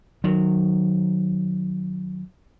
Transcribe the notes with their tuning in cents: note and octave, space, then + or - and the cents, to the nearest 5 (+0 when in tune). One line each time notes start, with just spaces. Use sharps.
D#3 -30 F#3 -10